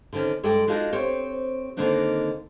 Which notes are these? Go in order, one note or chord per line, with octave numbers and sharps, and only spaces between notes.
D3 D#3 C4 C#4
G2 G#3 A4 D5 G5
G#3 D4 D#4 F4 F#4 G#4
C4 G4 C5 C#5
D3 D#3 A#3 C4 D4 D#4